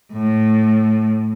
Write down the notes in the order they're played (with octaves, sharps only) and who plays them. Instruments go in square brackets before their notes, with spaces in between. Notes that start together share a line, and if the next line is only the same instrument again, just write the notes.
[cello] A2